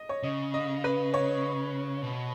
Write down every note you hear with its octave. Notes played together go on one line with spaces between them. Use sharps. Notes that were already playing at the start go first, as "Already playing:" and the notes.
Already playing: D#5
C#5
C#3 D#5
D#5
B4
C#5
B2